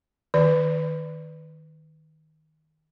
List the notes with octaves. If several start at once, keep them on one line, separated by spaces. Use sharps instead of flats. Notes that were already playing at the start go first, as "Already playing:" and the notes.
D#3 D5